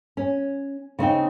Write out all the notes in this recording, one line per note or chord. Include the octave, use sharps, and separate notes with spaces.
C#4
C#3 C4 D#4 G5